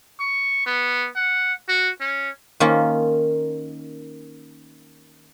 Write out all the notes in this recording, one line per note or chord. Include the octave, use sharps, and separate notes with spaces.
C#6
B3
F#5
F#4
C#4
D#3 A#3 C#4 F4